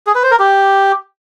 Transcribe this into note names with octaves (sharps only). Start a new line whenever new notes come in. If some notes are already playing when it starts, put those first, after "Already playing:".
G#4
B4
C5
A#4
G4